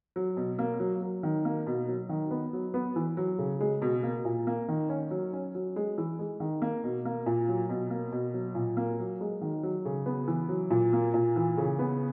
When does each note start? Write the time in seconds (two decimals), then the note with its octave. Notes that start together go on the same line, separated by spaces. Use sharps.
0.16 F#3
0.37 B2
0.59 A#3
0.80 F#3
1.02 F#3
1.23 D#3
1.45 A#3
1.67 B2
1.88 F#3
2.09 D#3
2.31 B3
2.53 F#3
2.74 B3
2.96 E3
3.17 F#3
3.39 C#3
3.60 G#3
3.82 B2
4.03 A#3
4.25 A#2
4.47 A#3
4.68 D#3
4.89 C#4
5.11 F#3
5.33 C#4
5.55 F#3
5.76 G#3
5.98 E3
6.19 G#3
6.40 D#3
6.62 A#3
6.84 B2
7.05 A#3
7.26 A#2
7.48 F#3
7.69 B2
7.90 A#3
8.12 B2
8.34 F#3
8.55 A#2
8.77 A#3
8.99 F#3
9.21 G#3
9.41 D#3
9.63 F#3
9.85 C#3
10.06 B3
10.28 E3
10.49 F#3
10.70 A#2
10.93 A#3
11.14 A#2
11.36 E3
11.57 C#3
11.79 B3